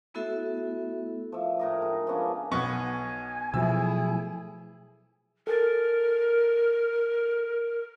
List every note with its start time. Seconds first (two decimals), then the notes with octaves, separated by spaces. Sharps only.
0.14 A3 B3 E4 F#4 A4 E5
1.32 F3 E5
1.59 A2 A#4 D#5
1.80 G#3 D#4 G#4
2.07 F3 B3 C#4 D4
2.51 B1 B3 G#5 C#6
3.54 B2 F3 F#3 A3 E4 G#4 E6
5.47 A4 A#4 G#5 A6